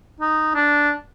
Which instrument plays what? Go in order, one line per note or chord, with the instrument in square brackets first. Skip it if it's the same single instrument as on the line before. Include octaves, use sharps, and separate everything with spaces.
[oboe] D#4
D4